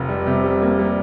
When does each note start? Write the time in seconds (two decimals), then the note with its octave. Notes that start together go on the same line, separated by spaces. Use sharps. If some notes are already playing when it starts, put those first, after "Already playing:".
Already playing: F1
0.09 G3
0.26 C3
0.44 G3
0.62 A#3
0.79 G3